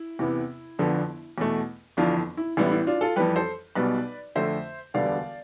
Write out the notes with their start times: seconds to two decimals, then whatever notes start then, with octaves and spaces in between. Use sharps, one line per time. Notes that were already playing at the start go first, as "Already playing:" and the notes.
Already playing: E4
0.19 E2 C3 E3 B3
0.79 G1 F2 D3 F3 B3
1.38 E2 B2 A3
1.97 G1 F2 E3 D4 F4
2.37 E4
2.57 A1 A2 G3 B3 E4
2.71 E4
2.87 D4 F4
3.01 F4 A4
3.16 F2 E3 G3 G4 B4
3.36 A4 C5
3.75 B1 B2 G3 B3 B4 D5
4.35 F2 D3 A3 C5 E5
4.94 E1 D2 D3 G3 B3 D5 F5